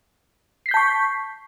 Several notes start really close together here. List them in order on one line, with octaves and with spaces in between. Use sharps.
C7 B6 G6 A5 C#6